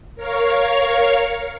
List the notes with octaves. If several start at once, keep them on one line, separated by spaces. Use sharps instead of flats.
A#4 C#5 F5 C#6 F6